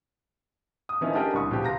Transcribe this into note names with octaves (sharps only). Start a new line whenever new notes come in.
D#6
D#3 F3 B3 C#4 D#4 E4
C#4 D4 G4 A4 A#4 D#5
C2 D3 C#6 D#6
B2 F3 G4
C#2 A#5 A#6